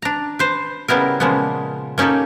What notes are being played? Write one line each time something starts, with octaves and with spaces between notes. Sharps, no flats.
D4 A#5
B4 C5
C#3 G3 B3 E4 A#4
A#2 C#3 F3 G#3 A#3 B3
A#3 C#4 D#4 G4 A4